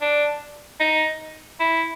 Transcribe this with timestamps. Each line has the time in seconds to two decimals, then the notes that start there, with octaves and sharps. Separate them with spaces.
0.01 D4
0.80 D#4
1.60 E4